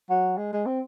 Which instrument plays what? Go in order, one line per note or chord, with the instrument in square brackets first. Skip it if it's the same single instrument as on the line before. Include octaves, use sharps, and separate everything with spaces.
[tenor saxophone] F#3
G#3
G#3
C4